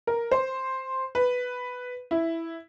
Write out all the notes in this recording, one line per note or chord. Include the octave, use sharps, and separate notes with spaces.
A#4
C5
B4
E4